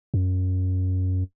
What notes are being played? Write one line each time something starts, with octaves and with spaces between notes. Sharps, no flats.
F#2